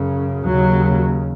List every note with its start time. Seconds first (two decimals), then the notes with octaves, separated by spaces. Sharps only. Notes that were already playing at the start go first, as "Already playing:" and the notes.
Already playing: F#2 C#3
0.46 D#2 C#3 F#3